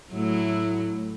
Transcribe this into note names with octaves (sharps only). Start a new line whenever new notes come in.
A2 F#3 A3 E4